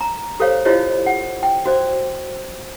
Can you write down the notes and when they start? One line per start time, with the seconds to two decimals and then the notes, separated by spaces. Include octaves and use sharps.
0.01 A#5
0.40 G4 A4 C5 C#5 F5
0.65 E4 F4 G4 C5 C#5 D#5
1.06 F#5
1.43 G5
1.65 F#4 C5 D5